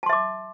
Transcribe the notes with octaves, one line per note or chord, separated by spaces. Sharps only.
E5 A5 C6 D6